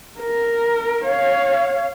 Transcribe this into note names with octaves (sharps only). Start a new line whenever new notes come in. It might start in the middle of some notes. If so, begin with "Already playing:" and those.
A#4
C#5 F5